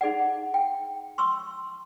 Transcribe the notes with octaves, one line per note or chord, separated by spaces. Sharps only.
D#4 G#4 D5 F#5
G5
C6 C#6 E6